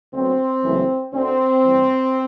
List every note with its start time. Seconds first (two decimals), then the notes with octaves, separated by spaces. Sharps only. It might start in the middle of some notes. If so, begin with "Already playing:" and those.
0.13 D2 D3 F#3 B3 C4
0.63 F#1 F#2 E3 A3
1.13 D2 D3 A3 C4
1.64 A1 G2 E3 G3